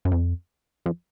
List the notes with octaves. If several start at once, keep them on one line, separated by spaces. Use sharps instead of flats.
F#2
F2
F2